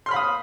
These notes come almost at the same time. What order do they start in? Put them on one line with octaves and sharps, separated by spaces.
C6 F6 B5 F5 D#6